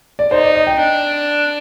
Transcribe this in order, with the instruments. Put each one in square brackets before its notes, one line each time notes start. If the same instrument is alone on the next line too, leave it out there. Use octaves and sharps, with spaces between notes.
[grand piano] D5
[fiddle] D#4 [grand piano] C5
[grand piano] D5
D#5
G5
[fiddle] D4